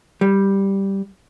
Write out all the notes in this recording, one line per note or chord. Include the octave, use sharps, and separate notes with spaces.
G3